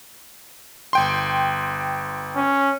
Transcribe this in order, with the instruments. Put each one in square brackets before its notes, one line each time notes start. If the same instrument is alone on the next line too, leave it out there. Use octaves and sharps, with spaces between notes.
[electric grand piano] G1 G5 C6
[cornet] C#4